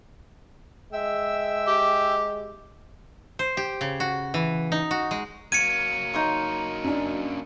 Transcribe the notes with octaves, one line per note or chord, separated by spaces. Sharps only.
G#3 E5 G5 E6
G4
C5
G4
C#3
F#4
E3
D#4
F#4
G#3
F#3 A#3 G#6 C#7 D#7
D#4 C#5 C6
F#2 D4